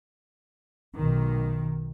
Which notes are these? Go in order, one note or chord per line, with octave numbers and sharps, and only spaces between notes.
B1 D#3